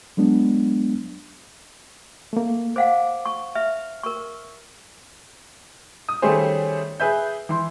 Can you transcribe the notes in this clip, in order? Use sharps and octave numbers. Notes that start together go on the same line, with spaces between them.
F#3 G#3 B3 D4
A3 A#3
C5 F5 F#5 D6
C#6
E5 F6
A#4 C#6
D#6
D#3 G3 A3 C#4 G#4 C5
G#4 B4 E5 G6
E3 C6